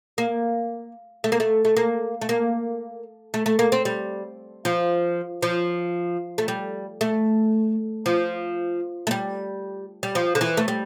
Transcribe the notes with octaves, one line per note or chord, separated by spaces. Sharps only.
A#3
A3
A#3
A3
A3
A#3
A3
A#3
A3
A3
A#3
C4
G3
F3
F3
A3
G3
A3
F3
A3
G3
G3
F3
D3
E3
A3
G3